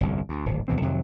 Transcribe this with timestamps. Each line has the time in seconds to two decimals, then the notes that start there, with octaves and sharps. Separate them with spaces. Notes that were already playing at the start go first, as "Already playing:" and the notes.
0.01 G1 C2 F2
0.29 D2
0.46 D1 G#1
0.68 D2 B2 E3 C4
0.81 F2 C3 D#3 F#3